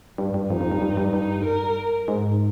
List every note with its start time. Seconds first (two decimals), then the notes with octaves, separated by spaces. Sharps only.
0.18 G2
0.34 G2
0.50 F2 D#4
0.61 F2
0.72 G2
0.82 G2
0.97 G2
1.13 G2 D#4
1.45 A#4
2.08 G#2